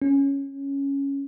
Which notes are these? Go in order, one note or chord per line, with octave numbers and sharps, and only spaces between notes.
C#4